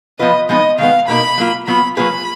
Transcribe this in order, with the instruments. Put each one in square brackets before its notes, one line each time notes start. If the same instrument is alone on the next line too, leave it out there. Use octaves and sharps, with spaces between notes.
[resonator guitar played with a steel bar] F3 B3 F4 B4 [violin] D#5
[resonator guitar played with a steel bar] F3 G#3 B3 D#4 [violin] D#5
[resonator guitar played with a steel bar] D#3 G#3 B3 [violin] F5
[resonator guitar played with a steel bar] B2 A#3 D#4 A#4 [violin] B5
[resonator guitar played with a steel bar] F#3 A#3 F4
[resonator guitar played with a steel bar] F#3 B3 F4 [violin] B5
[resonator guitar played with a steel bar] F#3 A#3 F4 G#4 B4 [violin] B5